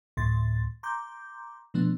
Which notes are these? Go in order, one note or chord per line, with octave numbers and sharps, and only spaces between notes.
D2 A2 C6 A6
A#5 C6 D6 G6
B2 F3 A3 B3 D4